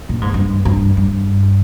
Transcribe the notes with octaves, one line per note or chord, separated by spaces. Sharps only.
A#2
G#2
G2
G2
G2